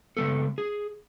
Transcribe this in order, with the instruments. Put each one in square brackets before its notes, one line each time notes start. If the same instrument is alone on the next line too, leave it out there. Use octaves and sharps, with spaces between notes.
[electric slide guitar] C#3 G#3 B3 A4
G#4